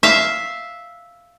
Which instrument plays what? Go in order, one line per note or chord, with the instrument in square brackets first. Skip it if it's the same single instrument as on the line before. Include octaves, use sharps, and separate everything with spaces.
[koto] E5 F5